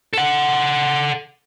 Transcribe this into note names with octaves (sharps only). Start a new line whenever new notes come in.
A4 F#5